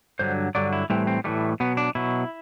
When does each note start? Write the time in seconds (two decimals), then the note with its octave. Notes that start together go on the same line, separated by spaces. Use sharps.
0.19 G2 D3 F#3 C5
0.55 G2 D3 F#3 D5
0.73 E4
0.90 A2 E3 G3 C4
1.07 C4
1.24 A2 E3 G3 A3
1.60 B2 F#3 B3
1.77 D4
1.95 B2 F#3 E4